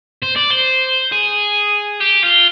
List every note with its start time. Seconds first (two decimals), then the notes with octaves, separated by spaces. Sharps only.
0.23 C5
0.37 D5
0.51 C5
1.12 G#4
2.01 G4
2.23 F4